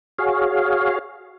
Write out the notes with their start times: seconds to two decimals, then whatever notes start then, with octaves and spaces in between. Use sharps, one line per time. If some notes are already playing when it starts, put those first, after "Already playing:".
0.19 F#4 G#4 C#5 F5